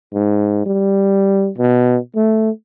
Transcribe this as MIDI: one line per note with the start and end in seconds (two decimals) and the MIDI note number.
0.14 0.65 44
0.66 1.50 55
1.58 1.97 47
2.15 2.50 57